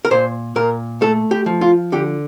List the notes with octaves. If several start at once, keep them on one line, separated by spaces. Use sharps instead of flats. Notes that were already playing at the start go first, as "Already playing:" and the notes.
A#4
A#2 C5
A#2 A#4
A3 A4
G4
F3
F4
D3 G4